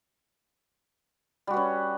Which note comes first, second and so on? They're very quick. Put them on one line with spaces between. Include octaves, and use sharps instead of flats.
G3 F#4 B4 C#4